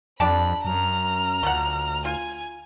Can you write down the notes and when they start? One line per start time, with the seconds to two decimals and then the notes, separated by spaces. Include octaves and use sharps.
0.20 F2 D4 G4 A5 B5
0.65 F#2 A#5 F6
1.43 D2 F3 F#5
2.05 F4 G#5 G#6